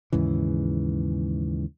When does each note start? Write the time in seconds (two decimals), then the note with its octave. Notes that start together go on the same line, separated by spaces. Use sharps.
0.13 D#2 G#2 C#3 E3